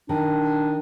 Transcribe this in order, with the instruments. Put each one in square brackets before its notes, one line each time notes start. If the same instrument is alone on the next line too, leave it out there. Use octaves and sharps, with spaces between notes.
[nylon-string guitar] D#3 [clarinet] D4